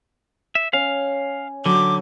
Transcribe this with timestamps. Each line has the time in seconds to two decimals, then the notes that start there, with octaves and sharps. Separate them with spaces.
0.55 E5
0.73 C#4 F5
1.66 D3 F#3 D6